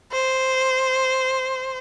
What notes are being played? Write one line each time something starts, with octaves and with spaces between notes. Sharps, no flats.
C5